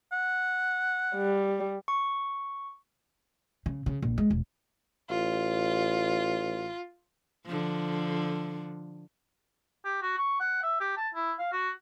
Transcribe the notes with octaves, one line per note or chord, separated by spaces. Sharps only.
F#5
G3
C#6
C#3
C#3
A#1
G#3
E1
A1 F4
D3 F3
G4
F#4
C#6
F#5
E5
G4
A5
E4
F5
F#4